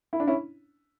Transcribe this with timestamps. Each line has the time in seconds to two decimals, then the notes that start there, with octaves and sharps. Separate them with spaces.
0.13 E4
0.20 D4
0.27 C#4 E4